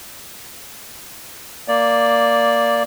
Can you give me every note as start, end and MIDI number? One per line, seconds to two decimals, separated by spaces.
1.68 2.83 58
1.68 2.83 74